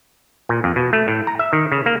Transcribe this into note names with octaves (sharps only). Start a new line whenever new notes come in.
A#2
F2
B2
A3
A2
A#5
E5
D#3
C#3
A#3